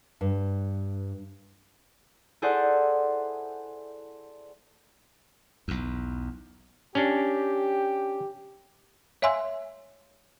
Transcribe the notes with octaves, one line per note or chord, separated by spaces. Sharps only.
G2
E4 G#4 A4 C5 D5 F#5
B1 E2
C#4 D4 G4
C#5 E5 F5 G#5 C6 E6